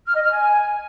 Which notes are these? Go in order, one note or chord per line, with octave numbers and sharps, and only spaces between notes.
F6
D#5
F6
G#5